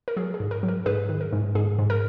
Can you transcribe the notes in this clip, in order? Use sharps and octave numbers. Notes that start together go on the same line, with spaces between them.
A#4
F#3 G#4
G#4
G#2
A#4
F#3
A#4
G#2 G#4 B4
D#3
A#4
G#2
G#2 G#4
G#2
A#4